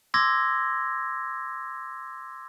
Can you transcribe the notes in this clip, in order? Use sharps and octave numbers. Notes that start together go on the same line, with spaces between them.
C6 D6 E6 G#6 A#6